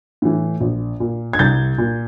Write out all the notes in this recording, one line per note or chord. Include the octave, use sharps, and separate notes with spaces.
A2 E3
A#1
A#2
G#6
C2 G6 A6
A#2